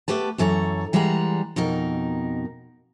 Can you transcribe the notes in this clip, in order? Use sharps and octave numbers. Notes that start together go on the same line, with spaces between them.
A3 B3 G4 B4 A5
F#2 E3 A4 C#5 A#5
E3 G3 G#3 F#5 A#5
F2 B2 D#4 A#4